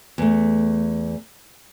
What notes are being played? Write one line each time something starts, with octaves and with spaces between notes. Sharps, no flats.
E2 A3